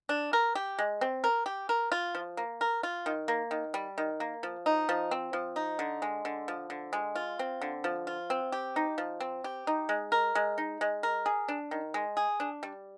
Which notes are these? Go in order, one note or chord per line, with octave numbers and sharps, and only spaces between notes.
D4
A#4
G4
G#3
C4
A#4
G4
A#4
F4
F3
A#3
A#4
F4
D#3
A#3
D#3
G3
D#3
A#3
F3
D#4
F3
C4
F3
D#4
D3
G#3
D3
F3
D3
G#3
F4
C4
D3
F3
F4
C4
G4
D#4
F3
C4
G4
D#4
G#3
A#4
G#3
D#4
G#3
A#4
G#4
D4
D#3
G#3
G#4
D4
G3